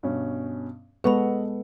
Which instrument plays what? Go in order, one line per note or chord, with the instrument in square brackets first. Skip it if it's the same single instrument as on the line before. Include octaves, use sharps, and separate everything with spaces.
[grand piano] G2 B2 C#4
[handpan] G#3 B3 A4 [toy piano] B4 B5 [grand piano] D#5 F#5 C#6